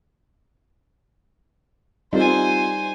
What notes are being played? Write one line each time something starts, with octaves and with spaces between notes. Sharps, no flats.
G3 C4 D#4 F4 A4 C5 G#5